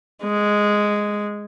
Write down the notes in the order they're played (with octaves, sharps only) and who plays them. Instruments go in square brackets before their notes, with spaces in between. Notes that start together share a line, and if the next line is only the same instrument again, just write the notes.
[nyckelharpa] G#3